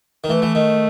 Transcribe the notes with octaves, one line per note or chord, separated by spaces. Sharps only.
D#3
E3 A3
E3
D#3